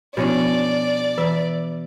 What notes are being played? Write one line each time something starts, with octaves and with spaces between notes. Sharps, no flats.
B2 F3 B3 C#4 D4 E4 D5
E3 E5